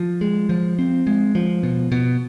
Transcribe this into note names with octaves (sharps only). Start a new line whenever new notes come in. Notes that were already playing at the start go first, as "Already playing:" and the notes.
Already playing: F3
G#3
F3
C4
G#3
F3
B2
B2